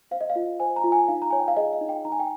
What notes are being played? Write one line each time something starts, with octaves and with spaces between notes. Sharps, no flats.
C5 F5
D#5
F5
F4
C5 G#5
A#5
F4
G#5
D#4 F5
A#5
C#5 G#5
G5
F5
G#4 D#5
F5
D#4
G5
D#4 A#5
G#5
G5